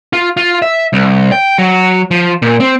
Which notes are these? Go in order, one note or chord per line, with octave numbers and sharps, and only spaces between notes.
F4
F4
E5
C2
G5
F#3
F3
A#2
C4